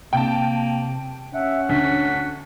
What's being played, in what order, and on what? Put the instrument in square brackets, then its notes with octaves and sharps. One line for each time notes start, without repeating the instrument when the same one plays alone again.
[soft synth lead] C3 [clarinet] A#3 [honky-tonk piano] G5 A5
[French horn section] C#4 [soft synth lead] E5 [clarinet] F#5
[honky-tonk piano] D2 [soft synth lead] B6